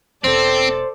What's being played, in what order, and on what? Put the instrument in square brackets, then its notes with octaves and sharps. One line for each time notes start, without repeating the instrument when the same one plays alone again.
[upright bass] E1 [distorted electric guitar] C4 [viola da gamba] A4 D5 [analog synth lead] C5